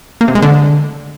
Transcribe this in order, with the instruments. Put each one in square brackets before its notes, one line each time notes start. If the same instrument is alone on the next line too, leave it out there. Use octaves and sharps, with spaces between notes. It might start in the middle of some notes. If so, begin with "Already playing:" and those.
[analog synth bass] A#3
C3
G#3
D3